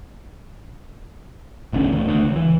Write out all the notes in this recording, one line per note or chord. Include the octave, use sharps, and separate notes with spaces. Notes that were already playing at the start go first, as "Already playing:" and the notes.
E1 A1 D3 C#4
D1 D2 D#3
D2
C#2
E3